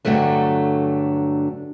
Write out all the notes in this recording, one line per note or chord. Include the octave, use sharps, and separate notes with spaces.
G2 D3 F#3 A3 D4